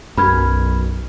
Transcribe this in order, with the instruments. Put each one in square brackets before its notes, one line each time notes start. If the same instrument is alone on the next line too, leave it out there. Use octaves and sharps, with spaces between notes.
[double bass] B1 [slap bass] F#2 [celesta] B5 F6 G#6